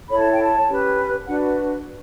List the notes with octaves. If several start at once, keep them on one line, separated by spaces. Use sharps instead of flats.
E4 A4 C#5 B5
A5
G5
A5
C#4 G4 B4
D4 F#4 B4 F#5